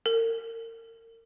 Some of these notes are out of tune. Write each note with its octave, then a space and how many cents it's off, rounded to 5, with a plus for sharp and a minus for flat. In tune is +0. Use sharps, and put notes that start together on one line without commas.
A#4 -35